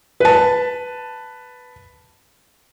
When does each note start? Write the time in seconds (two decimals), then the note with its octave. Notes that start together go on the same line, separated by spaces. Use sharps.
0.20 B4 A5